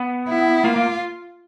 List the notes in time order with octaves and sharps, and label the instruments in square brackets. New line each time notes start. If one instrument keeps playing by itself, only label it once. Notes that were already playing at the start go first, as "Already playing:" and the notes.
Already playing: [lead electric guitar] B3
[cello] E4
[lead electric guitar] A#3 [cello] F4
[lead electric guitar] A#3